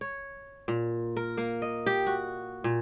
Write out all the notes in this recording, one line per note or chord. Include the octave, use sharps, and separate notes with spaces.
C#5
A#2
A#4
A#3
D#5
G4
F#4
A#2